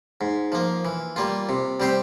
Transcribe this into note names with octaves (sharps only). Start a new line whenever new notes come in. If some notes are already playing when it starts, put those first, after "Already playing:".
G#2
F3 A#3
E3
G3 A#3 F4
C3
G3 C4 G4 C5